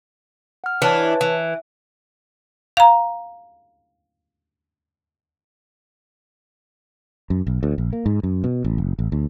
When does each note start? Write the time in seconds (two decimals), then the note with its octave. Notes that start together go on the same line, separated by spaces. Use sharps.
0.64 F#5 F6
0.82 E3 D4 B4 C#5 A5
1.21 E3
2.77 F5 A#5
7.30 F#2
7.47 B1
7.63 D2
7.78 A#1
7.93 A#3
8.06 G#2
8.23 F#2
8.44 B2
8.64 A1
8.78 F#1
8.99 A1
9.12 D2